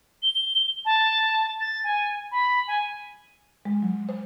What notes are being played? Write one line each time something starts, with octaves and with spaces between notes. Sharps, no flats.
G7
A5
A6
G#5
B5
G#5
G#3
F#3
C5